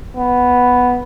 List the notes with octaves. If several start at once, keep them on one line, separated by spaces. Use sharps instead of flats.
B3